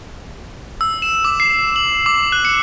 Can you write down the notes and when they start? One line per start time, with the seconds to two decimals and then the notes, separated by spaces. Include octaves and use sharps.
0.81 E6
1.02 E7
1.25 D6
1.40 C7
1.76 F#7
2.06 D6
2.32 F#6
2.45 C#7